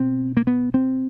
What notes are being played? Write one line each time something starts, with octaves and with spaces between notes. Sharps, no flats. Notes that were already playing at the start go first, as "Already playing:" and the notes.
Already playing: B2 C4
A#3
B3
C4